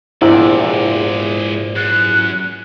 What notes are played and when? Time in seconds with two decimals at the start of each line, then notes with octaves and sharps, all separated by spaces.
0.22 A#1 E2 G#2 C3 G#3 E4 D5
1.76 F#2 F#6